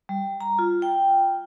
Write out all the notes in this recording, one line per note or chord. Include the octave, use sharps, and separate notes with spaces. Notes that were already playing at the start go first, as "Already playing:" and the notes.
G3
A#5
F4
G5